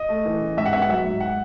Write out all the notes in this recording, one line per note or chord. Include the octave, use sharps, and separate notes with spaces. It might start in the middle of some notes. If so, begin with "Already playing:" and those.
Already playing: D#5
A3
E3
C#3
G#2 E5
F#5
B3 E5
F#5
F#3 E5
G#2
F#5